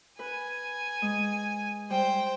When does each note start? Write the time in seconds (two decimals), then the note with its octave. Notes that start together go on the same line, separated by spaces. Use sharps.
0.19 B4 G#5
1.02 G#3
1.90 G3 C5 G5